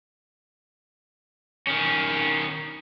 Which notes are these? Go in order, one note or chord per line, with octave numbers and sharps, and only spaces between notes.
D#3 C#4